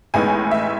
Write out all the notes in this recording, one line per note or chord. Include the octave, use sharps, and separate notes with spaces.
A1 A2 G#3 B3 D#4 G#5
E5